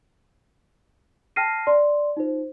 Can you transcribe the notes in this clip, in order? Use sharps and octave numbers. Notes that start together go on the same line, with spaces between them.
G5 A5 F6 A#6 C7 D#7
D5 C6
D#4 F4 C5